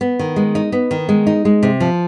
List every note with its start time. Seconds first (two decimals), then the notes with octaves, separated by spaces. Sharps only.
0.01 B3
0.19 D#3
0.36 G#3
0.55 D#4
0.72 B3
0.91 D#3
1.09 G#3
1.27 D#4
1.45 G#3
1.63 C3
1.80 F3